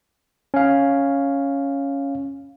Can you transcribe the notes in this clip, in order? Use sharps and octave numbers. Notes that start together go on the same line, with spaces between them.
C#4 F5